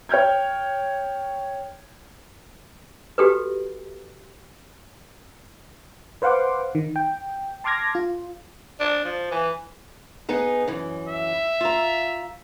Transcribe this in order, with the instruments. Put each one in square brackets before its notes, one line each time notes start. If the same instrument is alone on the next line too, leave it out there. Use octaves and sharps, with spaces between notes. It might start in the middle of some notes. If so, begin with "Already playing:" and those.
[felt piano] C#5 G5 F6 G6 G#6
[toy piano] F#4 G4 A4 B4
[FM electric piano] B4 C5 F5 F#5 C6 D6
D#3
G5
A5 C6 D6 F6 G#6 A#6
F4
[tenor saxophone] D4
F3
E3
[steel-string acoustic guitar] B3 D#4 G#4
F#2 E3
[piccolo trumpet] E5
[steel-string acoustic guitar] F4 F5 A#5